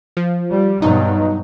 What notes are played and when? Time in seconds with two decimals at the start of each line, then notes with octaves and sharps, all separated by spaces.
0.17 F3
0.49 G3
0.82 G2 B2 F#3 D#4